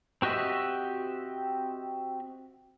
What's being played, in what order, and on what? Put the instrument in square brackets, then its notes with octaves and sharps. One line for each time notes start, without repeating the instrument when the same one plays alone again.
[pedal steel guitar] C4 F#4 G4 D#5 E5